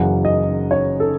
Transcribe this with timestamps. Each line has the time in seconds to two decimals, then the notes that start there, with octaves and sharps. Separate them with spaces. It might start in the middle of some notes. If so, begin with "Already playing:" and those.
Already playing: F#1 F#2 C#3 E3 F#5
0.25 D#5
0.71 C#5
1.00 A4